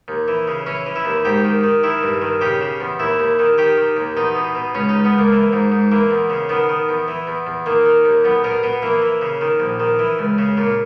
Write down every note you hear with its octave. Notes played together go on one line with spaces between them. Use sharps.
D#2
E3
C#3
E3 C#4
E3
E4
D#2
G#2 G4
D#3
D#3
D#3 E4
G2
D#3
C#3 G4
C#3
E2
D#2 E4
D#2
D#3
D#3 G4
D#3
D#2
E2 D#4
B2
B2
C#2 C#4
C#2 D#4
B3
C#2
A#3
E3
G#2
G#2
E3 A#3
E2
C#3
D#3 B3
D#3
E2
E3
E2
E2
D#3 A#3
D#3
D#2
B1 B3
B2 A#4
B2 B3
E3 A#3
E3
C#3
D#3
A#1
D#3
E3
C#2
C#3
A#2